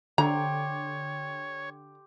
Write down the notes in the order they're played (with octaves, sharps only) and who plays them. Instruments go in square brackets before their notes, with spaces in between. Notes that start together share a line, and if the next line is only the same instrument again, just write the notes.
[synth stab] D3 [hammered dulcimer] G4 C6 [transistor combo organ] C#5 [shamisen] A#5